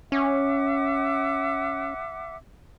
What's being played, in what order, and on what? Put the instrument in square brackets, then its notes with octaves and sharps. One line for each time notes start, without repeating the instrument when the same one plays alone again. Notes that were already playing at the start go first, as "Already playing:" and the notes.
[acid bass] C#4 [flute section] E5 F#5 D6